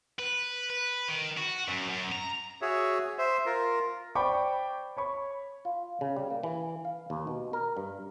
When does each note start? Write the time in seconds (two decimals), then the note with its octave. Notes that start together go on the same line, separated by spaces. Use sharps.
0.19 B4
0.70 B4
1.09 D#3
1.37 F#4
1.68 F#2
1.89 F#2
2.12 A#5
2.62 F#4 G#4 C#5 E5
3.18 C5 E5
3.46 F4 A#4
4.15 C5 D5 G5 B5 C#6 D6
4.97 C#5 B5 C#6
5.65 F4
6.01 C#3
6.17 G3
6.30 A#3
6.43 E3
6.85 F5
7.10 D#2
7.27 B2
7.53 A#4
7.77 G2